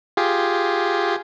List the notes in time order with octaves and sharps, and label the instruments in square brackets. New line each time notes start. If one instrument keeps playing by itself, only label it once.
[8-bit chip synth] F4 G4 G#4